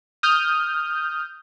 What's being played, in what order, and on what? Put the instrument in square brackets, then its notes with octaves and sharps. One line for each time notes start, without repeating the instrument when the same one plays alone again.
[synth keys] D#6 F6 G6